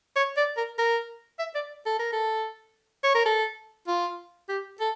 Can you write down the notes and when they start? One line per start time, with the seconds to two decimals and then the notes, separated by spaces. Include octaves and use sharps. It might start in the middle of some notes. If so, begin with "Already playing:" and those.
0.16 C#5
0.37 D5
0.57 A#4
0.79 A#4
1.39 E5
1.55 D5
1.86 A4
1.99 A#4
2.13 A4
3.04 C#5
3.15 A#4
3.25 A4
3.88 F4
4.49 G4
4.80 A4